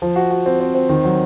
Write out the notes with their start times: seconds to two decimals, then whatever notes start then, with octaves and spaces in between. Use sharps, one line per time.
0.02 F3
0.16 F#4
0.31 F#4
0.46 C4
0.60 C4
0.75 C4
0.89 D#3
1.05 F#3